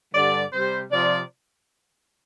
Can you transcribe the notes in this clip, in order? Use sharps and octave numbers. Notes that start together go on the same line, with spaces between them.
G2 D3 G3 D5
C3 G3 C5
C3 F3 D5